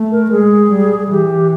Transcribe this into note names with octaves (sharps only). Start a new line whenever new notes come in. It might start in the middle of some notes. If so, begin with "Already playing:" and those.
Already playing: A3
A#4
G#3 G#4
G3
E3 G4